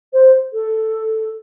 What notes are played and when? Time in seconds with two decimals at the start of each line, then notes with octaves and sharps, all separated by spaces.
0.13 C5
0.53 A4